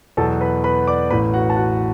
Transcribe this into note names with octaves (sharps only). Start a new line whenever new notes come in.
E2 B2 F#3 A4 A5
B4 B5
B4 B5
D5 D6
A1 A2 E3 B4 B5
F#4 F#5
A5
F#4 F#5